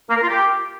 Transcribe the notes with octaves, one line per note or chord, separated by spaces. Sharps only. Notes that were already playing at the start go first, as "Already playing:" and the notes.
A#3
A#4
F4
G4